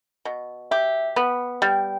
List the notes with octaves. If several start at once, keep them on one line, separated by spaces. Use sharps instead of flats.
B2
G4 E5
B3
G3 G5